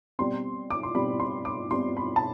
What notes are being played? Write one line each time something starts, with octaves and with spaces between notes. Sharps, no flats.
B2 G3 C4 C6
D6
C6
B2 G3 C4 B5
C6
D6
B2 G3 C4 C6
B5
A5